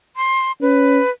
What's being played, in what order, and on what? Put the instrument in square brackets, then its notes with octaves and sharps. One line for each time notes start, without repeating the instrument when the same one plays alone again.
[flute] C6
[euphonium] C#4 [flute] B4